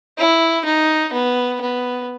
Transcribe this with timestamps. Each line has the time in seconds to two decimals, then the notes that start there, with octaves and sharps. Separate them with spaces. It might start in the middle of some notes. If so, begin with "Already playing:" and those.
0.17 E4
0.65 D#4
1.12 B3
1.61 B3